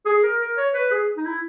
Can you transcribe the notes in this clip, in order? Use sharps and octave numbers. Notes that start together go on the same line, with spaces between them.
G#4
A#4
A#4
C#5
B4
G#4
D#4
E4